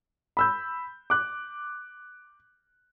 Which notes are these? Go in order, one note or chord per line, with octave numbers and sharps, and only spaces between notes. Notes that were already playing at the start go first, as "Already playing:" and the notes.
B5 E6 G6
D6 F#6